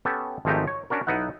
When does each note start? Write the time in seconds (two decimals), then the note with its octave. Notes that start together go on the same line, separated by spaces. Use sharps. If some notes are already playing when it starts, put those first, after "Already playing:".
0.05 B3 C#4 G4 A4
0.45 G#1 F3 G#3 A3 D#4 G4
0.67 C#5
0.90 C#4 D4 F#4 A#4
1.07 B1 B3 D#4 E4 F#5